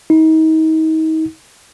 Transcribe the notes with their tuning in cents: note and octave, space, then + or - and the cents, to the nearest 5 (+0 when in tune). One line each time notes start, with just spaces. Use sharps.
D#4 +35